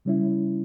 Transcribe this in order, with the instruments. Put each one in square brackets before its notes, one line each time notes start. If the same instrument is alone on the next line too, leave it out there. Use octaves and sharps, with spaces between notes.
[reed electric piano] C#3 G3 C#4 E4